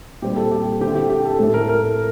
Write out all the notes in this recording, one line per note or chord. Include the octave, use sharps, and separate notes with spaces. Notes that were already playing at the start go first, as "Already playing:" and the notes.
A#2 G3 C4 G4
A4
G4
D3 A3 C4 G4
G4
G4
A4
A2 A3 C4 A4
A#4
A#4